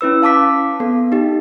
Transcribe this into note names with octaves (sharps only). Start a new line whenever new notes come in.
C#4 E4 B4 E6
F5 A5 D6 B6
B3 A4
D#4 G4